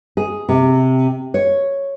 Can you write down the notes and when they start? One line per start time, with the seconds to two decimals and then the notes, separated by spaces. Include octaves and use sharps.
0.17 G#4
0.49 C3
1.34 C#5